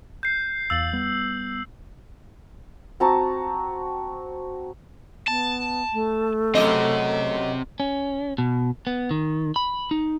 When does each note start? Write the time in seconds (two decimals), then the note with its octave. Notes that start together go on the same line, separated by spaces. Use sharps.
0.23 G6 C7
0.70 E2 F5 E6 A6 F#7
0.93 G3 B3
3.00 C4 F#4 A5 A#5
5.28 B3 A5
5.93 A3
6.55 F#2 C#3 C4 G4 D#5
7.80 C#4
8.38 B2
8.87 B3
9.11 D#3
9.56 B5
9.91 D#4